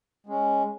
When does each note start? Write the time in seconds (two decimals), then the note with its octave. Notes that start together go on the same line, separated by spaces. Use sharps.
0.26 G#3 C#4